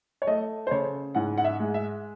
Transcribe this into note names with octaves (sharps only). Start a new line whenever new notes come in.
C#5
A3 D#5
C5
C#3 C#5
G#2 F#5
F#5
E5
G#3
E5